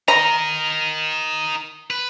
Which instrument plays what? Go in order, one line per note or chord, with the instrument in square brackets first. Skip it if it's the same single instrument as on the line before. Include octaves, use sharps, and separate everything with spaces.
[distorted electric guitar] D#4 A#4 [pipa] A#5
[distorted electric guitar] B4